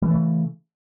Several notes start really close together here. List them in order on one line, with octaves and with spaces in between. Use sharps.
G3 E3 A3 C#3